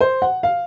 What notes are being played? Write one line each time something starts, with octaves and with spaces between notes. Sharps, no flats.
C5
F#5
F5